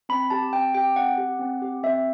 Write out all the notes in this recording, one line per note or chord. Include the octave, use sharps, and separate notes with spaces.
C4 B5
G4 A5
C4 G5
G4 G5
C4 F#5
G4
C4
G4
C4 E5